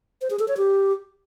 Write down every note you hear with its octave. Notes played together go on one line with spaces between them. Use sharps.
C5
G#4
A4
C#5
G4